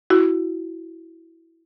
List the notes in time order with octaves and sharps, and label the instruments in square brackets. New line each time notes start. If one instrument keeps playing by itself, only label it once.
[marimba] E4 F#4